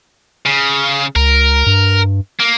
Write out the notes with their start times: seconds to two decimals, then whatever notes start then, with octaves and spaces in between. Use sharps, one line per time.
0.46 C#3
1.16 C#2 A#4
1.67 G2
2.40 A#3